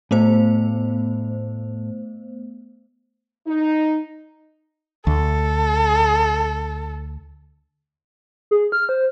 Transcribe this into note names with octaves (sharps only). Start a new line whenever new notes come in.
A2 A3 B3 C5
D#4
D2 A4
G#4
F6
C5